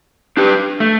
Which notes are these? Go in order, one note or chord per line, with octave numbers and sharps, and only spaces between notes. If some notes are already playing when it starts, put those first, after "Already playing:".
D4 G4 B4
A3